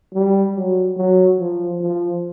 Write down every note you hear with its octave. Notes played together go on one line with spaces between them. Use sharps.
G3
F#3
F#3
F3
F3